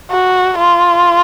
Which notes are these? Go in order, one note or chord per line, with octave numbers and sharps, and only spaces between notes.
F#4
F4